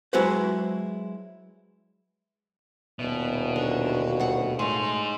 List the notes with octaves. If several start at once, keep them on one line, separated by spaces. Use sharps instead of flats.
F#3 G#3 E4 F#4 B4 C5
D#1 B2 E5
D3 F#4
D2 F#5
A2 D#4 G#4 C6